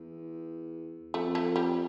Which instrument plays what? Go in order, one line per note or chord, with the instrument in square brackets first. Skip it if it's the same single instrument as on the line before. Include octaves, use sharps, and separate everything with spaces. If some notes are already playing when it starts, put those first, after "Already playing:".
Already playing: [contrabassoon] E2
[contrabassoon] F2 [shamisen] A3
[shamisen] A3
G3